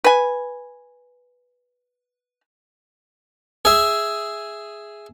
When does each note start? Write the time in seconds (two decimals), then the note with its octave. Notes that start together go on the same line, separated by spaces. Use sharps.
0.04 B4 G#5
3.65 G#4 E5